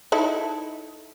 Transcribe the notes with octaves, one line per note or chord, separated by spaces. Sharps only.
D#4 E4 A4